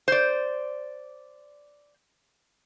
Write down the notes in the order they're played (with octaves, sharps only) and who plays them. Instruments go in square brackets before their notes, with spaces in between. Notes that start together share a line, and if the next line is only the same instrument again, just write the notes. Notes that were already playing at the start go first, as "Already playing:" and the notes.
[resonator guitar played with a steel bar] C5 D5